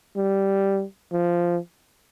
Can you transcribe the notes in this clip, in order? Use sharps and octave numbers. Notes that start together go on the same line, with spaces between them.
G3
F3